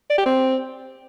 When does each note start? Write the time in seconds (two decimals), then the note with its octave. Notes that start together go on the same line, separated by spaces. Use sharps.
0.10 D5
0.18 G4
0.26 C4